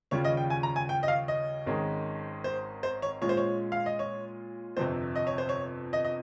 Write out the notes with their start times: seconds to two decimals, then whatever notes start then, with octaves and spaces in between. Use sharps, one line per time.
0.11 D#2 C#3 G3 C#4 F4 C#5
0.24 D#5
0.37 G5
0.50 G#5
0.63 A#5
0.76 G#5
0.89 G5
1.03 D#5
1.08 F5
1.28 D#5
1.66 G#1 G#2 D#3 G#3 C#4
2.44 C5
2.83 C5
3.02 C#5
3.22 A#2 G#3 C#4 F4 C#5
3.29 C5
3.37 C#5
3.72 F5
3.86 D#5
3.99 C#5
4.77 G1 F2 C3 C5
5.15 D#5
5.27 C#5
5.38 C5
5.49 C#5
5.93 D#5
6.04 D#5